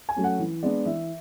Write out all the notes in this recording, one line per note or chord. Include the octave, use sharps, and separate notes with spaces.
G#5
F#3 A3 C#4
F#5
E3
G#3 B3 D4 D5
E3 E5